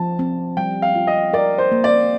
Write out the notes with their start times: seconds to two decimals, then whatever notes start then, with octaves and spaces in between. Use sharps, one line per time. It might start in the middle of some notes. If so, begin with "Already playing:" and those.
Already playing: F3 A5
0.19 C4
0.57 G3 G5
0.82 F5
0.95 F4
1.07 D#5
1.33 A#4 D5
1.58 C5
1.72 A#3
1.84 D5